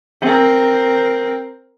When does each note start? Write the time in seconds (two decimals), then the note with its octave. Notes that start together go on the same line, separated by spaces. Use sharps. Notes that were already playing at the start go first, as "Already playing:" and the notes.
0.22 C4 A#4